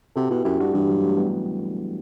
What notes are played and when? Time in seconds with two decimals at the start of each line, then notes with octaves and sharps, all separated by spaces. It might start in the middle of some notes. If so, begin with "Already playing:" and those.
0.16 C3 F#4 A4
0.30 B2 E4 G4
0.45 F#2 E4 G4
0.60 G2 D4 F#4
0.74 G2 E3 G3
0.89 F#3
1.03 F#3 A3
1.18 G3 B3